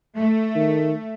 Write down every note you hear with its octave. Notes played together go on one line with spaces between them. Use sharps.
A3
D#3